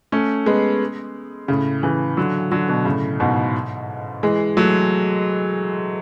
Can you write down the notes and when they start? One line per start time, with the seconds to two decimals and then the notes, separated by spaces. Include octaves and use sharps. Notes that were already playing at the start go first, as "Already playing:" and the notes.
0.12 A3 C#4
0.46 G#3 B3
1.48 A2 C#3
1.83 C#3 E3
2.17 D3 F#3
2.51 D3 F#3
2.68 B2 D3
2.85 A2 C#3
3.20 G#2 B2
4.23 E3 G#3
4.57 F#3 A3